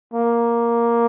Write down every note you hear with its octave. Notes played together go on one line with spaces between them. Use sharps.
A#3